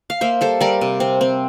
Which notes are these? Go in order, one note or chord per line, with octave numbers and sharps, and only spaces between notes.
F5
A#3 C5 E5
G3 A4 C5
G3 A#4 D5
C3
C4
C4